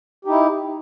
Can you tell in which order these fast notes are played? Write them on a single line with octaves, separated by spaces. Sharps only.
G4 D#4 E4